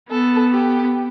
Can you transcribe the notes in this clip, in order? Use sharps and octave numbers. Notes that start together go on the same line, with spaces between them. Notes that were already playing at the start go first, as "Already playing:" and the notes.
B3 A4
G4